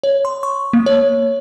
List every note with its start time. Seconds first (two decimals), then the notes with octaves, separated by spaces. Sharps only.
0.03 C#5
0.25 C6
0.43 C#6
0.73 A#3
0.86 C#5